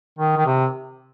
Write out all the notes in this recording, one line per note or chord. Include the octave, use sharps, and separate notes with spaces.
D#3
D#3
C3